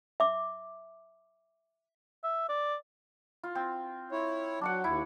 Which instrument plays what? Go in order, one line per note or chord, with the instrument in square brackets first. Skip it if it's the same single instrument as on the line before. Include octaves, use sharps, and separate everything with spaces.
[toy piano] E5 D6
[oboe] E5
D5
[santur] F4
C4
[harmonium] E4 C#5
[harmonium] F#3 [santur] D4 F#4 F#5
[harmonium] D#2 [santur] E4